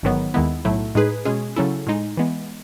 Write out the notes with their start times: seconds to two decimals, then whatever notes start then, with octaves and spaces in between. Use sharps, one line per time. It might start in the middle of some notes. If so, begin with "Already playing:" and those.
0.03 A1 G#2 D#3 F#3 B3
0.34 D#2 D#3 G#3 B3 E4
0.65 B1 A2 F#3 A3 E4
0.95 A2 G#3 D#4 G#4 B4
1.25 B2 G#3 C#4 G#4
1.56 C#3 F#3 C#4 E4 A4
1.87 A2 G#3 D#4
2.17 E3 G#3 B3